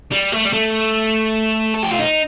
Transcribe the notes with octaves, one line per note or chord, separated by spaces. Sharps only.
G3
A3
G3
A3
A4
G4
F4
D#4